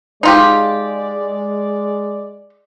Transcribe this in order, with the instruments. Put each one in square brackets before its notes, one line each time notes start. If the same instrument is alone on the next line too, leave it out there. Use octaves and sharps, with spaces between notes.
[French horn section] G#3 D5 [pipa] D#4 F4 G4